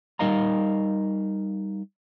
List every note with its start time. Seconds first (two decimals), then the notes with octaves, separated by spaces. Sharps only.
0.19 G3 D#4 A#4 D#5 F5 A#5